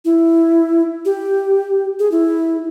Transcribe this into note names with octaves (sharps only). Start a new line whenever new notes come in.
E4
G4
G#4
E4